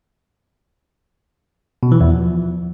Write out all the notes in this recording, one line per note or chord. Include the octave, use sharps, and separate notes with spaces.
B2
E3
E2
F3